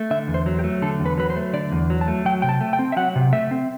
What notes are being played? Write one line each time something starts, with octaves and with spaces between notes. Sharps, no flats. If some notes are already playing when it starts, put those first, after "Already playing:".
Already playing: A3
D3 E5
E2
C5
F#3
G4
A3
D3 A4
E2
B4
F#3 B4
C5
A3
D3 D5
E2
F#3
A5
A3
F#3 G5
C3 G5
A5
A3
G5
C4
E5
F#3 F#5
C3
A3 E5
C4